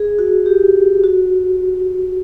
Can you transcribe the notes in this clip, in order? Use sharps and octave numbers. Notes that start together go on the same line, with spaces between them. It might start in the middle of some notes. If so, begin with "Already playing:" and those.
Already playing: G#4
F#4
G4
F#4